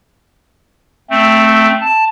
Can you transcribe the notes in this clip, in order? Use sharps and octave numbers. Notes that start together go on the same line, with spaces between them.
A3 C4
A5